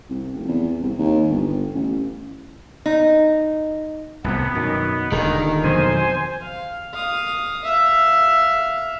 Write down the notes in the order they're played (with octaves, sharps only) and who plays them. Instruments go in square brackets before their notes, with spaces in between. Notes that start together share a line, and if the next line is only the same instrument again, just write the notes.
[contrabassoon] C2
F1
E2
C2
D#2
G1
A1
[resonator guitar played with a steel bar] D#4
[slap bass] C2 A2 C3 [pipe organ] B3
[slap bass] F#2 [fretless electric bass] B2 D#3
[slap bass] D#1 [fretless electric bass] D3 G#3 [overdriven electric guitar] D#3
[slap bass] F2 B2 F#3 [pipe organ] C5 G#5
[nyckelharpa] F5
F5 D#6
E5 F5